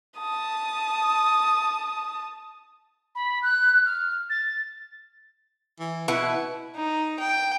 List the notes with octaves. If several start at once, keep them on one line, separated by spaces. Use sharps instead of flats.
A5 D#6
B5
F#6
F6
A6
E3
B2 E4 B4 F#5
D#4
G5